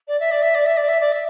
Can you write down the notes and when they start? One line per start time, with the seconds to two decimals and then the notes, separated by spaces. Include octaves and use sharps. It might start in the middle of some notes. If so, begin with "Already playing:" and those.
0.08 D5
0.20 E5
0.31 D5
0.42 E5
0.55 D5
0.66 E5
0.77 D5
0.88 E5
1.00 D5
1.12 E5